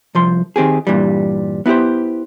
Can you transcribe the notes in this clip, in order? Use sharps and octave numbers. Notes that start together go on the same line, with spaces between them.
C2 F3 C6
D#3 C4 G4 G#4
G2 A#2 E3 G3
B3 E4 F4 G4 C5